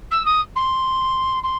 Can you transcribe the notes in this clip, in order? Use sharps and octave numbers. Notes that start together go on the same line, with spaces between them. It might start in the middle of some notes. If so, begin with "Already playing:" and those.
E6
D#6
C6
C6